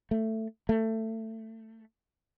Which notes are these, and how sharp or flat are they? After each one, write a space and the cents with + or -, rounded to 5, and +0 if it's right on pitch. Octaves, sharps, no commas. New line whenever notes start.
A3 +10
A3 +20